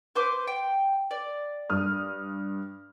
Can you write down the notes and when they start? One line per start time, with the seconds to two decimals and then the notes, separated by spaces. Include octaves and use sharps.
0.15 B4 C5 D6
0.47 G5
1.11 D5
1.70 G2 D#6 F6